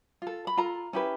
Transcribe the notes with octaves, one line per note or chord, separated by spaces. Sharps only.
F4 A4
B5
F4 A4 A#5
C#4 E4 G4 B4